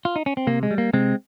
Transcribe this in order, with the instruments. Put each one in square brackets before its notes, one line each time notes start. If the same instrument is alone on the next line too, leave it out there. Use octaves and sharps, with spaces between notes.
[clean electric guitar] F4
D#4
C#4
C4
C3 A#3
G#3
G3
A#3
C3 G#3 C4